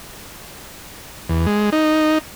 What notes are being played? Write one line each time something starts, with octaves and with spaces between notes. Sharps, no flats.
E2
G#3
D#4